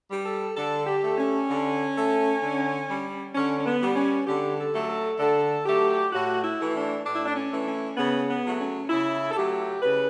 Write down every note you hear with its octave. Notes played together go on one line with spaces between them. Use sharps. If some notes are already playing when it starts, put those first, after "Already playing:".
G3
A4
D3 A4
G4
A3
C#4
D3
A3
D3
G3
D3 C#4
C#4
B3
G3
C#4
D3 G4
A4
F#3 A3
A4
D3 A4
F#3 A3 G4
A2 F#4
E4
E3 A3
D4
A2 D4
E4
D4
C#4
E3 A3
C#4
C#3 B3
B3
F#3 A3
C#4
C#3 E4
A4
F#3 A3 G4
C#3 B4